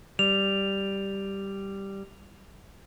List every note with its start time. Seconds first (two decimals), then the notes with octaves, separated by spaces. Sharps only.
0.19 G3 F7